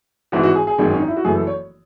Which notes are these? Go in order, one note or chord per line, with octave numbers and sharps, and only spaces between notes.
G#1 G#2 E3 F#4
F#4
G#4
G#4
G#1 F#2 D#3 G#3
C#4
D#4
E4
F#4
F#1 F#2 E3 A3 G#4
A4
C#5